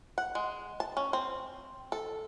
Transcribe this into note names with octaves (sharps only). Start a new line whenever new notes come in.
F#5
G#3
A5
C#4
C4
A4